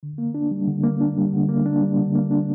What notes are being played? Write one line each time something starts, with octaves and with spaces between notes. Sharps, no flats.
D3
A#3
D4
G3
D3
A#3
D4
G3
D3
A#3
D4
G3
D3
A#3
D4